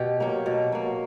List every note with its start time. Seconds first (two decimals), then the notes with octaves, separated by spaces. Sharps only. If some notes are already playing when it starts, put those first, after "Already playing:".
Already playing: B2 G4
0.20 F#3 A#3
0.46 B2
0.72 F#3 A#3